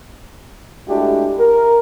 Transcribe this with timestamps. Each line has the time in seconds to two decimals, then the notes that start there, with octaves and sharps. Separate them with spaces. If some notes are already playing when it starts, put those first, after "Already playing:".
0.88 G#3 A3 D4 E4 F#4 G4
1.39 A#4